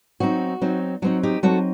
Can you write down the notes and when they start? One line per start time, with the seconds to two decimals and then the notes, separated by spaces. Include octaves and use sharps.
0.20 F#3 C4 D#4 F#4
0.61 F#3 C4 D#4
1.02 F#3 C4 D#4 F#4
1.23 D#4 G4
1.43 F#3 C4 D#4 F#4 A4